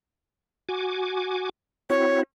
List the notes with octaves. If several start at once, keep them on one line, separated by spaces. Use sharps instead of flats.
F#4 G#5 D6
C4 E4 F#4 C#5